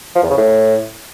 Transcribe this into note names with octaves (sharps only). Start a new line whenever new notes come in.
F3
E2
C#3
A2